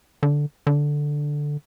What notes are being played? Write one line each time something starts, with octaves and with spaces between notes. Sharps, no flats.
D3
D3